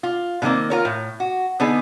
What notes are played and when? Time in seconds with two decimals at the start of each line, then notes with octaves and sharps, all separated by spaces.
0.03 F4
0.42 B2 D#3 A3 A#3 C4
0.70 F4 A#4 C#5
0.85 A2
1.20 F#4
1.60 D3 B3 D#4 G#4